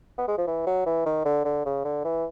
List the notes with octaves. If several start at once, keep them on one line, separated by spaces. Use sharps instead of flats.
B3
G#3
F3
E3
F#3
E3
D#3
D3
D3
C#3
D3
E3